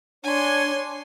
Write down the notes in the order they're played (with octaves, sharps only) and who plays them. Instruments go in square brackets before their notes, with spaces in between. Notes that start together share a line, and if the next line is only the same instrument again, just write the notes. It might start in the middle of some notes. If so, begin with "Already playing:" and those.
[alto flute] D4 [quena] C#5 [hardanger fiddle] G#5 C6